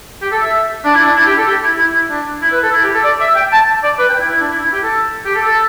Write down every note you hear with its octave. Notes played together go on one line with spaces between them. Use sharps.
G4
A4
E5
D4
E4
D4
E4
G4
A4
G4
E4
E4
E4
D4
E4
B4
A4
E4
G4
A4
D5
E5
G5
A5
D5
B4
G5
E4
E4
D4
E4
E4
G4
A4
G4
A4
A4